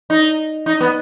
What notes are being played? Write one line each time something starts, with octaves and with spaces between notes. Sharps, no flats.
D#4
D#4
B3